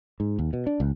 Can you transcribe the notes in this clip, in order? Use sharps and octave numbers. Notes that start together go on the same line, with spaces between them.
G#2
D#2
B2
D4
C#2